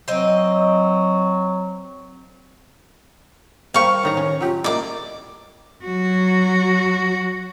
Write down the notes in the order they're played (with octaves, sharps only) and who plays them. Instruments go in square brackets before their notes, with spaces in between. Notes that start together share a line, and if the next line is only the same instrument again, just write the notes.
[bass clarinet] F#3 [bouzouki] C4 D#5
[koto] G3 A#3 G4 [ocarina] C5 [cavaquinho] F5 C#6
[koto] A2 D#3 A#5 [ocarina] C#5
[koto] C#4
[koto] F#3 G4 [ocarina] F4
[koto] A#3 E4 [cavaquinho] D5 D6 [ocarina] D#5
[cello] F#3 F#4